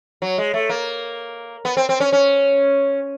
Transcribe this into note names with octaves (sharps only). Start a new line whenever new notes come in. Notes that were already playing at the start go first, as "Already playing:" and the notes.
F#3
G#3
A3
A#3
B3
C4
C4
C#4
C#4